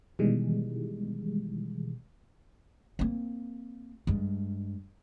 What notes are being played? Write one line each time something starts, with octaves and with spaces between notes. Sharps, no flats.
B2 D#3 E3 G3 G#3
A#3 C4
G2 G#3